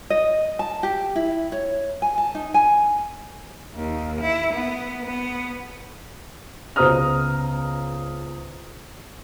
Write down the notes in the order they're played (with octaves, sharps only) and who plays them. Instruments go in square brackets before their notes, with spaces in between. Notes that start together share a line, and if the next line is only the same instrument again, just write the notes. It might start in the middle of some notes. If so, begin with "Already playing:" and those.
[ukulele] D#5
A5
G4
E4
C#5
G#5
A5
D#4
G#5
[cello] D#2
E4
B3
B3
[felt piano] C#2 B3 C5 A#5 D#6 F6